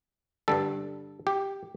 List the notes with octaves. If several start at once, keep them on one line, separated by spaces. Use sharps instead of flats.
G2 D3 G3 A4
G4